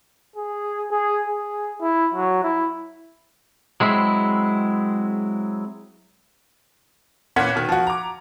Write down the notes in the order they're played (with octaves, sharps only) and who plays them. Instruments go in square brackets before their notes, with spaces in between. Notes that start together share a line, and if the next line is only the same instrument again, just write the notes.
[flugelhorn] G#4
G#4
G#4
E4
F#3
E4
[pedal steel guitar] F#3 G#3 C4 E4
[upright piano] A#2 E3 C#4 F#5 G#6 B6
B2 D#3
F3 F#4
A#5 D6